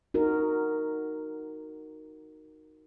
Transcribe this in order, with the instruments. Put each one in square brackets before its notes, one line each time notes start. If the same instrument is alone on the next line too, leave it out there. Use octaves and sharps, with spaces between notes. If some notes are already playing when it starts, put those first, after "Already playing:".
[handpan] D#4 F#4 A#4